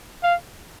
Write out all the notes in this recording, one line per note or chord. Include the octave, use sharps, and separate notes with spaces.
F5